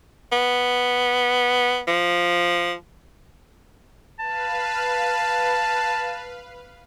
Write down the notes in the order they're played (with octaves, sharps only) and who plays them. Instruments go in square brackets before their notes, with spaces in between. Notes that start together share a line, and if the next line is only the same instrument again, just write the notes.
[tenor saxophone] B3
F3
[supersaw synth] B4 F5 [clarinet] A5